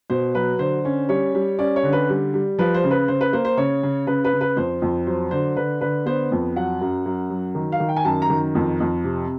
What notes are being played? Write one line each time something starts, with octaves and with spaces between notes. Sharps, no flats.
B2 C5
F#3 B4
D3 C5
C#4
G3 C#5
G3
C#4 D5
C#5
D3
B4
G3
G3
F3 B4
C5
C#3
B4
C#3 C5
B4
A#3 C5
C5
C#3 C#5
C#3
C#3 B4
B4
C#3
B4
F2 C5
F2
F#3 C5
D3 C5
D3 B4
D3 B4
B3 C5
F2
F#3 F#5
F#2
F#2
F#3
D#3
F5
D#3
G5
G#5
F#2 A5
A#5
D#3
F2
F2
C3